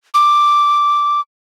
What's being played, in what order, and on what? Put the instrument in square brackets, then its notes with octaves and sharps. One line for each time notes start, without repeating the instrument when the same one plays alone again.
[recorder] D6